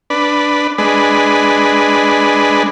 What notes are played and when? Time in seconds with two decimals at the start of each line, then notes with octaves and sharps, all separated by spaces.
0.10 D4 B4
0.78 G#3 D4 B4